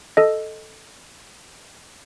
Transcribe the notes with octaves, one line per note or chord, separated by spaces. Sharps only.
A4 D#5